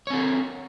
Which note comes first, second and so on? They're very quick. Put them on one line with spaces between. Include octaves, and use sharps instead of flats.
C#5 C4 A4 A#4